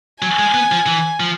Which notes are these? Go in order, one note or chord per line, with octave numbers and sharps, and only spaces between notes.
F#3 G#5
G#3
B3
F3
E3
F3